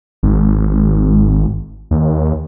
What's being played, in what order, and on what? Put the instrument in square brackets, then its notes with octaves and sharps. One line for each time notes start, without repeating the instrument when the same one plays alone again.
[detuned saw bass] G#1
D#2